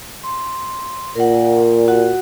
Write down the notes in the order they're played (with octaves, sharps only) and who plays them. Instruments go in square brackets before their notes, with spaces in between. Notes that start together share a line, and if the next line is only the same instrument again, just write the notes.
[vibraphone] C6
[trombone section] A#2 [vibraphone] A#4 F#5
[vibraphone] F#4 F#5